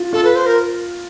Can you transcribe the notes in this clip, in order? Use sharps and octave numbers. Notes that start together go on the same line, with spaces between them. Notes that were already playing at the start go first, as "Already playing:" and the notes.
Already playing: F4
F4 A4
B4
C5
A#4